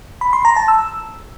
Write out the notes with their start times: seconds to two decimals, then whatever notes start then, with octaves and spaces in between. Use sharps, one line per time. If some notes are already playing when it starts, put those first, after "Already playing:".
0.21 B5
0.33 C6
0.45 A#5
0.56 A5
0.68 E6